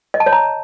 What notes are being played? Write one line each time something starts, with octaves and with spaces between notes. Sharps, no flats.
D#5
A5
C#5
A#5